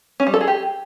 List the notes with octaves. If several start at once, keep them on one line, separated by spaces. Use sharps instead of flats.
C#4
G3
A4
G#4
G4